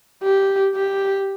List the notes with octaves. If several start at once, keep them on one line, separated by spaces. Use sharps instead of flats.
G4
G4